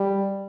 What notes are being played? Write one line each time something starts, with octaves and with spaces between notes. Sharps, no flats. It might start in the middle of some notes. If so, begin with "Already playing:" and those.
Already playing: G3